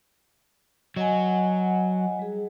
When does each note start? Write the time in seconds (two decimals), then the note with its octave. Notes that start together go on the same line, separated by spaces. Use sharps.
0.96 F#3 D#5 F#5 G#5
2.19 G3 G#4